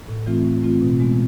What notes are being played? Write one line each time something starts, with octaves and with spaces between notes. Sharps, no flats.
A2
E3 A3 C4 F4
A2
E3 A3 C4 F4
B2
G#3 B3